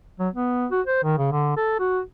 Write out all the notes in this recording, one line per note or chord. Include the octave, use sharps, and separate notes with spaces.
F#3
B3
F#4
C5
D#3
C#3
D3
A4
F#4